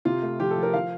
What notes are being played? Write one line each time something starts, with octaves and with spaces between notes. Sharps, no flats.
C3 F4
A3
F3 G4
A4
F3
A#4
F3 F5